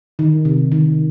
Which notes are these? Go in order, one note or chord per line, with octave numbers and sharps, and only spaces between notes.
D#3
C3
D#3